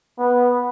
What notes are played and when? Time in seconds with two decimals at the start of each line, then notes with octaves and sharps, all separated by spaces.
0.19 B3